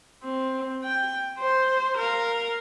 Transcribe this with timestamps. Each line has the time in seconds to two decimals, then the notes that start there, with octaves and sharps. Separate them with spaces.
0.23 C4
0.85 G5
1.38 C5
1.97 A#4 F5